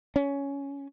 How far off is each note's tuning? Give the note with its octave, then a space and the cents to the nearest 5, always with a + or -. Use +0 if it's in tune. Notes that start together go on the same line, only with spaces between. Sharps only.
C#4 +10